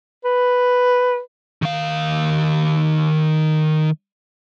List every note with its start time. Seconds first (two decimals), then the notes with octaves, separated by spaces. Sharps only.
0.25 B4
1.62 D#3 F5